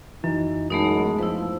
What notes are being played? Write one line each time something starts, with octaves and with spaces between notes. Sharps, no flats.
F#2 E3 D#4
F#2 G#3 A3 B3 D#4
F3 E4 B4